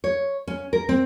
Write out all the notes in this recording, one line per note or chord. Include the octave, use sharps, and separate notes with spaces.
C#5
C#4
A#4
C4